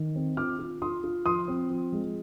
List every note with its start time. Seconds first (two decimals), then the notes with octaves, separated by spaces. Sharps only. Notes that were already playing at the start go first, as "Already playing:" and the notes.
Already playing: D#3
0.15 C4
0.37 F4 D6 F6
0.59 F4
0.82 F4 C6 D#6
1.04 F4
1.26 F3 C6 D#6
1.48 C4
1.70 F3
1.92 G#3